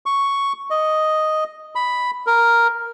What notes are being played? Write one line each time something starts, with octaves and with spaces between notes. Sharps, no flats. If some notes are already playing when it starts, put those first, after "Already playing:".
C#6
D#5
B5
A#4